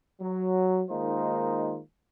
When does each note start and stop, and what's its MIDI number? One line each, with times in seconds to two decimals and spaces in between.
0.21 0.83 54
0.90 1.79 51
0.90 1.79 56
0.90 1.79 58
0.90 1.79 63
0.90 1.79 65
0.90 1.79 72